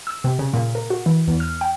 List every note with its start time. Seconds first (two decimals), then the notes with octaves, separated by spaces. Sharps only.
0.07 E6
0.24 C3
0.39 C#3
0.53 A#2
0.75 A#4
0.90 F#4
1.06 E3
1.28 E2
1.40 F6
1.61 G5